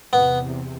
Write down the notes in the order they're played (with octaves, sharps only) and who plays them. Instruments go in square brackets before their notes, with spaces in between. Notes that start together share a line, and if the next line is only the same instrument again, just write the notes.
[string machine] E2 C3 [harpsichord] B3